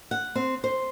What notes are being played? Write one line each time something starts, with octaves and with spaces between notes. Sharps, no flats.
F#5
C4
C5